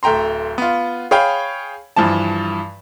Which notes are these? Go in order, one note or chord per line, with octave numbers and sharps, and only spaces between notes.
D1 A3 G5 A#5 C6
B3 F4
G#4 C#5 F5 G5 B5
G2 E3 F3 A5